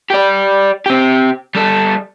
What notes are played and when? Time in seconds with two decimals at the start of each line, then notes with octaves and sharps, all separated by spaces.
0.10 G4 D5
0.86 C4 G4
1.55 G3 A4